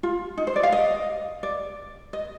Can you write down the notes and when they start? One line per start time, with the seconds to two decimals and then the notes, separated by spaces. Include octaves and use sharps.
0.03 F4
0.37 D#4
0.47 C5
0.56 D5
0.63 F5
0.72 D#5
1.43 D5
2.13 D#5